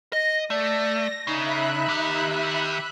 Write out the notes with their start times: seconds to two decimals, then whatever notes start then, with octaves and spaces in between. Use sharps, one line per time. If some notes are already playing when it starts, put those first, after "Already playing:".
0.13 D#5 A#6
0.50 A3 D5 A#6
1.27 C#3 D#4 E5 B5 F#6
1.88 D#3 G4